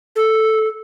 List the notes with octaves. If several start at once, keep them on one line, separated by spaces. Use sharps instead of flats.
A4